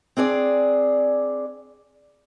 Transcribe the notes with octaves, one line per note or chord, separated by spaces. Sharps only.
C4 D4 G#4 D5